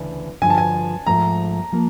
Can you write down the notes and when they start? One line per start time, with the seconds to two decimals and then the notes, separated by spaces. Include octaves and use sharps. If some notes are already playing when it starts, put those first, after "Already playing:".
Already playing: D2 C#3 E3
0.42 G2 D3 F3 G#5
0.50 A5
0.58 G#5
1.06 G#2 F3 A3 A#5
1.72 F3 A#3